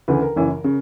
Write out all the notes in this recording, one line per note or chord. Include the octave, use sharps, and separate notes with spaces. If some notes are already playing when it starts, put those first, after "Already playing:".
D2 C#3 E3 B4
A#4
F#1 F#2 E3
C#3